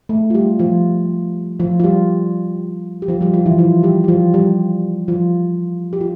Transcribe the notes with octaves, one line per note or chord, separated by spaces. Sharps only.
A3
F4
G3 G4
F3 F4
F3 F4
F4
G3 G4
G4
F3 F4
G3 G4
F3 F4
E3 E4
F3 F4
G3 G4
G4
F3 F4
G3 G4
F3 F4
G4
F4